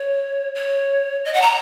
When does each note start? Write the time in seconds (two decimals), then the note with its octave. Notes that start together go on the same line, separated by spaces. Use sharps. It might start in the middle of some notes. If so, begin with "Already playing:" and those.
Already playing: C#5
0.55 C#5
1.25 D#5
1.34 F#5
1.42 A#5